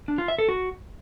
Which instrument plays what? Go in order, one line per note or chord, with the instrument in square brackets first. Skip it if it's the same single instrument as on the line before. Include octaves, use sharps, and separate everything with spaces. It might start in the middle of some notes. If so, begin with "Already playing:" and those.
[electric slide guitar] D4
F4
E5
A4
F#4